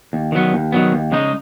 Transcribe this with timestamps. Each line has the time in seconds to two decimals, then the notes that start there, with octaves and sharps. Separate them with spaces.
0.13 D#2
0.32 D#3 F#3 B3
0.53 D#2
0.72 D#3 F#3 B3
0.92 D#2
1.12 C#3 G#3 D#4